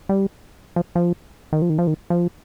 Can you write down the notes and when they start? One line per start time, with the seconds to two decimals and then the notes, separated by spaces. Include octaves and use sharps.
0.09 G3
0.76 F3
0.95 F3
1.53 D#3
1.62 F3
1.70 D#3
1.78 F3
1.87 D#3
2.10 F3